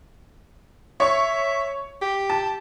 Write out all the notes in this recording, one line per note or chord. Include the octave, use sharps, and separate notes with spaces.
C#5 E5 C#6
G4
A5